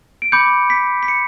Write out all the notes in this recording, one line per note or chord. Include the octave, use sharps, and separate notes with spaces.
D7
B5 D6 G6 C#7
B6
B6
C#7